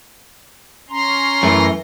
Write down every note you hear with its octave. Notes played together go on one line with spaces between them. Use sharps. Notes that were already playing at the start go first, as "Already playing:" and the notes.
C#4 A#5 C6
F#2 E3 A3